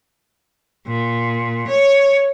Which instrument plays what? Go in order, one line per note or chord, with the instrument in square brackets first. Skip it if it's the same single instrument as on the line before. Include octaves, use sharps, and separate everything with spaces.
[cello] A#2
C#5